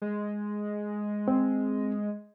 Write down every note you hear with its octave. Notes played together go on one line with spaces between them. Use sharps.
G#3
C4